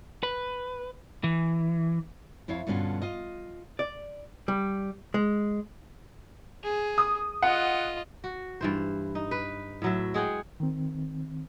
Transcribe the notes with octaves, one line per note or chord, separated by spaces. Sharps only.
B4
E3
F2 E4 C#5 F5
G2 B2 D3 C#4 F4
F4 D#5
D5
G3
G#3
G#4
D#6
F4 D#5 F#5
F#4
G2 E3 C5
D#4
B4
A2 F#3 E5
G#3 G#4 F#5 G5
D#3 C4